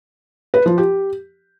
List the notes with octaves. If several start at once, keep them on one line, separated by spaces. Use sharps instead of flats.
B4
F3
G4